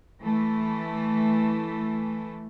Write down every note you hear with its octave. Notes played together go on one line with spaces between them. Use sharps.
E3 A3